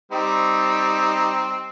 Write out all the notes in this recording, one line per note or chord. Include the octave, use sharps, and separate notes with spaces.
G3 C4 D#4